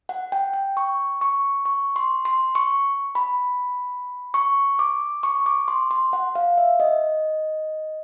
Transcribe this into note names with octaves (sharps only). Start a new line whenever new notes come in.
F#5
G5
G5
C#6
C#6
C#6
C6
C6
C#6
B5
C#6
D6
C#6
D6
C6
C6
F#5
F5
E5
D#5